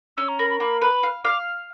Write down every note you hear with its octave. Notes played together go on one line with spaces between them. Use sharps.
C#4 E6
A#5
A#4 B5
B5
A#3 B5
B4 B5
F5
F5 D6